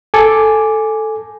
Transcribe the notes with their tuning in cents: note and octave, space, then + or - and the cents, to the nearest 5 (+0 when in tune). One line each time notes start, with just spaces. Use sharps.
A4 +0 G#5 +0 D6 +0